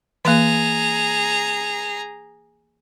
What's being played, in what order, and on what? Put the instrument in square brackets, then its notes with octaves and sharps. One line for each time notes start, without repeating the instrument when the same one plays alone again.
[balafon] E3 A#3 [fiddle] G#4 A#5